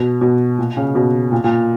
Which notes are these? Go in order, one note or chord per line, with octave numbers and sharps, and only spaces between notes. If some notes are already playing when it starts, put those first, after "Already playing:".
Already playing: B2
B2
A#2
C#3
B2
A#2
A#2